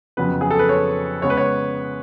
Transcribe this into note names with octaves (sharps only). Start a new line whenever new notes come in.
F2 C#3 F#3 B3 B4
G#4
A4
B4
C#5
C#3 G#3 B3 C#5
B4
C#5